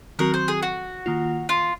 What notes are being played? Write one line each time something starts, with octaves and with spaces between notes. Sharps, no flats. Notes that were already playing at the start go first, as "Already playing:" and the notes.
D#3 F#3 C4 F#4 A#4
C5
G#4
F#4
D#3 A#3 F4
F4